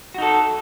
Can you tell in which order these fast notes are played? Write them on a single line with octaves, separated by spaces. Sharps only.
F#4 D#4 A4